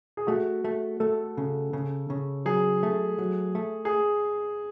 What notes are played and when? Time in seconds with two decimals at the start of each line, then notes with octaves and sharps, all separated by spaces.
0.17 G#4
0.27 A3 F#4
0.64 A3
1.00 A3 A4
1.37 C#3
1.73 C#3
2.10 C#3
2.46 F#3 G#4
2.83 A3
3.19 F#3
3.55 A3
3.85 G#4